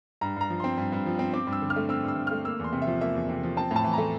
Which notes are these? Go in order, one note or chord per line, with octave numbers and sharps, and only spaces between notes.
G2 A#5
G2 A#5
F3
C4 C6
G2
G2
F3
C4
C4 D6
G2
E6
D3
F6
A3
C4 E6
G2 E6
D3
A3 F6
A#3 E6
E2 C6
C3
E5
F3
A#3 E5
E2
C3
F3
C4 A5
A2 A5
E3
A3 A#5